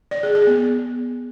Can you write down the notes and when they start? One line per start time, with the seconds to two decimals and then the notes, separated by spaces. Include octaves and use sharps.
0.11 D5
0.23 G#4
0.35 G#4
0.47 B3